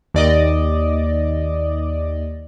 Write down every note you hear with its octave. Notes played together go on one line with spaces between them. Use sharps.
D#2 D5 D#5